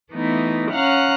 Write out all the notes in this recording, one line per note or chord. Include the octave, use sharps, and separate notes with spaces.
E3 A3 B3 D#4
C#4 F5 F#5 A#5 F6 F#6